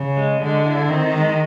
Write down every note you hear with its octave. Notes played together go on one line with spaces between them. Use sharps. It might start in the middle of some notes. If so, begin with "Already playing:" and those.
Already playing: C#3
G#3
D3 G#3
E4
D#3 C4
G#3